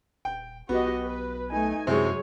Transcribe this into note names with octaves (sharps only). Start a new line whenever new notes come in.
D#1 G5
B1 B3 F#4 G4 D#5
B4
A3 D#4 G#5
F#2 C3 E3 F#3 G#3 G#4 C#5